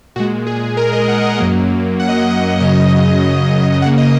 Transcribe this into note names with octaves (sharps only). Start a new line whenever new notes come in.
A#2 G#3 F#4
G#4
A#4
D#5
F#5
D#5
F#2 F#3 A#3
F#5
D#5
F#5
D#5
F#2 C#3 F#3 D#5
C#3 A#3 F#5
D#5